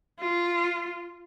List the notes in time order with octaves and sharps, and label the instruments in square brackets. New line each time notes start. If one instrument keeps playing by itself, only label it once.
[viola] F4